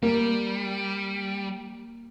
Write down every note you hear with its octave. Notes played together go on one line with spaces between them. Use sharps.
G3 A#3